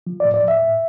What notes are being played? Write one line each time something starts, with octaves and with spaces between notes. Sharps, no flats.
F3
D5
A2
D5
A2 E5
A2